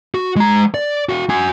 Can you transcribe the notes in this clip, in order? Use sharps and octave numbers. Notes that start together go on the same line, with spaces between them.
F#4
G#3 A#5
D5
F#4 F5
F#4 G#5